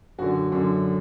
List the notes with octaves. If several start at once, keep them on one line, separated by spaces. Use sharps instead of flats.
F#2 D3 F#4
F#2 D3